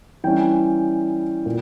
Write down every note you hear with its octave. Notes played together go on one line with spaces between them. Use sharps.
E3 G3 C#4 G5
A#2